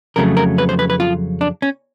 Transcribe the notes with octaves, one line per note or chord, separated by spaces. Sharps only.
F2 C#3 F#3 A3 A#4
A#4
B4
C5
B4
B4
F4
D4
C#4